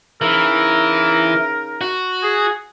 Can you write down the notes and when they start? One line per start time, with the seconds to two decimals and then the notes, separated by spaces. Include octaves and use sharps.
0.21 C#3 E3 D#4 A#4
1.81 F#4
2.23 G#4